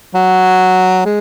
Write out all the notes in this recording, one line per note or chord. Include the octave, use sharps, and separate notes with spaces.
F#3
G#3